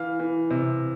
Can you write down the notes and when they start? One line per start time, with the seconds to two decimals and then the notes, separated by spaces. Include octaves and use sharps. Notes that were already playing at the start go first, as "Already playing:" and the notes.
Already playing: E3 F5 F6
0.20 E3
0.50 C3